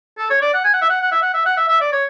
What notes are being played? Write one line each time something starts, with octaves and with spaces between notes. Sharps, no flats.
A4
C#5
D5
F#5
G#5
F#5
E5
F#5
F#5
E5
F#5
E5
F#5
E5
E5
D5
C#5